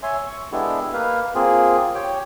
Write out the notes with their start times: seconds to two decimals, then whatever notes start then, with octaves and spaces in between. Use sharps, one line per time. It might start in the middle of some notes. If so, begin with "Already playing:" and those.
0.03 C#5 E5 G#5 C6
0.26 C#6
0.52 G#3 B3 D4 E4 G4 A4
0.93 A#3 B4 F5
1.35 A#3 C4 F4 G#4
1.95 G4 C#5 G5